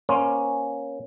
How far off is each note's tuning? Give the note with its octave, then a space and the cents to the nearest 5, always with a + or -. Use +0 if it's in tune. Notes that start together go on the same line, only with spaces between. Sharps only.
A#3 +20 C#4 +0 C5 +0